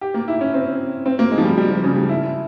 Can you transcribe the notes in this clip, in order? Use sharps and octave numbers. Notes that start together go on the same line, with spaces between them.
G4
A#3
E4
C#4
C4
C4
A#3
G#3
F3
G3
G3
F3
C#3
G3
E4